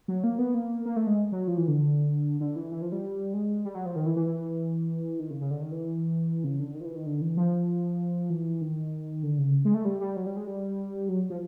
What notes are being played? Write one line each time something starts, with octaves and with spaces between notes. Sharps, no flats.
F#3
A#3
B3
A#3
A#3
A3
G#3
F#3
F3
E3
D3
D3
E3
E3
F3
G3
G#3
G3
F#3
F3
D#3
E3
E3
E3
D#3
C#3
C#3
D3
D#3
E3
C#3
D3
D#3
F3
E3
D#3
D3
E3
F3
E3
D#3
D3
C#3
G#3
A3
G3
G3
F#3
G3
G#3
G3
F#3
F3